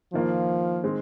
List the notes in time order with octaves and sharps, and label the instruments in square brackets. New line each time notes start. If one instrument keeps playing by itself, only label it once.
[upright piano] D#3 A#3 F4 [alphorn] F3
[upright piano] D#3 G#3 C4